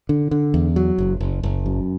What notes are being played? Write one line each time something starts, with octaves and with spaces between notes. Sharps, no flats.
D3
D3
E2
F#3
F#1
F#1
F#1
F#2